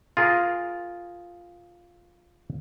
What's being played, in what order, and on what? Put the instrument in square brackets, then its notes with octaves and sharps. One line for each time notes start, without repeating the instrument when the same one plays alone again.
[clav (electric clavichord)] F4 G#4 A#4